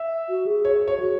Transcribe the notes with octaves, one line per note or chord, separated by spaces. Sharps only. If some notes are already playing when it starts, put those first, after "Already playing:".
Already playing: E5
F#4
G#4
C#5
C#5
F#4